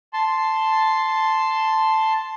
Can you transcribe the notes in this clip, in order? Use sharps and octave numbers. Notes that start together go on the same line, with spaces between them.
A5 C6